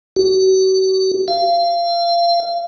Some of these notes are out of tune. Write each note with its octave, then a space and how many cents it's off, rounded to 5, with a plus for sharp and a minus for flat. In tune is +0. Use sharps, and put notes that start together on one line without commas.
F#4 +45
F5 -25